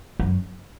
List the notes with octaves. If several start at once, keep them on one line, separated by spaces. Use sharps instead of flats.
F#2